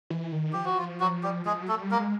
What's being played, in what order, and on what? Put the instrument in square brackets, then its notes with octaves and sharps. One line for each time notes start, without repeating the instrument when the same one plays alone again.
[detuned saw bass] E3
D#3
[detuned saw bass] F3 [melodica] G4
[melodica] F#4
F4
F#3 F#4
G3 G4
[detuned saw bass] F3 [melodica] G#3 G#4
[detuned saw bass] F#3
[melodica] A3 A4
[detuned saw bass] G3
[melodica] A#3 A#4
[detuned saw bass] G#3